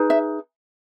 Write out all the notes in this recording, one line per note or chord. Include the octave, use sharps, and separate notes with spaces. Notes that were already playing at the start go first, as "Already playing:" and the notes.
Already playing: D#4 G#4 B4
E5